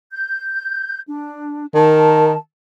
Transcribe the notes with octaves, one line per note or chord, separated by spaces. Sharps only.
G6
D4
D#3 A#4 A5